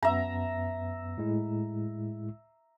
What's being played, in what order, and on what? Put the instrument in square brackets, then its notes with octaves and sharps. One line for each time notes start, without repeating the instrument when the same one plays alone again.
[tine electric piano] F#2 B3 [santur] E5 A#5
[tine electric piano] A2 G#3 E4